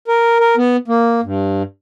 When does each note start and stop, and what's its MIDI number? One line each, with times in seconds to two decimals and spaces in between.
0.08 0.38 70
0.40 0.56 70
0.57 0.77 59
0.88 1.21 58
1.23 1.63 43